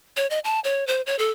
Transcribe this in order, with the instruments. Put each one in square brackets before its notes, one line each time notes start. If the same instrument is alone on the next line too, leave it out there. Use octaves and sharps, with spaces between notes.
[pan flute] C#5
D#5
A5
C#5
C5
C#5
A4